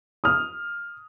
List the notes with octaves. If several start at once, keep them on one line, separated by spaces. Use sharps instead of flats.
D#6 F6